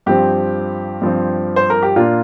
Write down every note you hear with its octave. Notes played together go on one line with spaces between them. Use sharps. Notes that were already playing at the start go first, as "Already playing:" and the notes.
G2 F3 C4 G4
G2 F3 C4
C5
A#4
G4
A#2 A#3 D4 F4